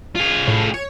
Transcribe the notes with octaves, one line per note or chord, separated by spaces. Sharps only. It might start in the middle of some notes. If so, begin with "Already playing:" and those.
F4 G#4
A2
C#5